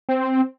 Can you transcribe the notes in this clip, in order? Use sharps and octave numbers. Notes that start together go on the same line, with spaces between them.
C4